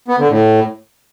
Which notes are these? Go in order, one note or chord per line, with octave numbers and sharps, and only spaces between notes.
B3
D3
A2